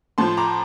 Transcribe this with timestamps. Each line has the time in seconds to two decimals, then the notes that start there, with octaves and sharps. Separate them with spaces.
0.18 A2 F3 A5 C6
0.37 A#5 D6